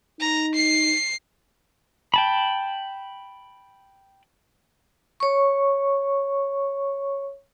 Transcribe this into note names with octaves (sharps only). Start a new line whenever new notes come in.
D#4 A#5
C7
G5 A5 B5
C#5 C#6